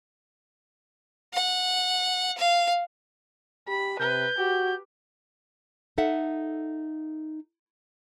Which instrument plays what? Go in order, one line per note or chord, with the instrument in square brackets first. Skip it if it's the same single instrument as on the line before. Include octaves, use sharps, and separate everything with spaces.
[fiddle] F#5
F5
[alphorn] G4 [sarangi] B5
[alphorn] C3 [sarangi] B4 [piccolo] G6
[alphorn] F#4 [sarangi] G4
[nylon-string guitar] D#4 A4 E5 F#5